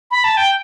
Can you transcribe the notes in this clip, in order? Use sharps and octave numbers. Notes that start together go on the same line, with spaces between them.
B5
A5
G5